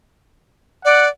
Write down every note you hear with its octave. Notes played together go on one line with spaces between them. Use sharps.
D5 F#5